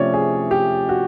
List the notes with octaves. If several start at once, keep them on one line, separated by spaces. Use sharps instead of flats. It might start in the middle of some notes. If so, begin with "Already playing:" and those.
Already playing: C3 F3 A3 C#4 C#5 D5
G#4
G4
F#4